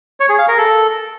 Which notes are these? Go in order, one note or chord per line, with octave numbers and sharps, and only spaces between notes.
C#5
G#4
F5
A#4
A4